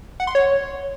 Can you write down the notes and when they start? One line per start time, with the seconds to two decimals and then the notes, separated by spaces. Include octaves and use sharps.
0.20 F#5
0.27 C6
0.35 C#5